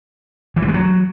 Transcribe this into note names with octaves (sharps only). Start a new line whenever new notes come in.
E3
G3
G#3
F#3